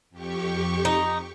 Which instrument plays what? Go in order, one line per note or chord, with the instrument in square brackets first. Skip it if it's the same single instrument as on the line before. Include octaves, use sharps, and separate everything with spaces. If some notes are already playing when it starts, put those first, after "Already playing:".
[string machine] F2 G4 C#6
[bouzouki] D#4